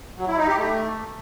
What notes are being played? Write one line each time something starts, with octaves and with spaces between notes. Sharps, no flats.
F#3
E4
D#4
G4
A3